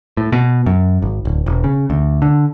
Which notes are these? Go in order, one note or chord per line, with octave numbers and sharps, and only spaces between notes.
A2
B2
F#2
G#1
D1
E1
C#3
D2
D3